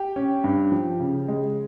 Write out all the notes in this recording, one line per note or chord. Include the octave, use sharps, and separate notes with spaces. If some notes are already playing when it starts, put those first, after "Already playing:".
Already playing: G4
C#4
G2
F3
C#3
G#3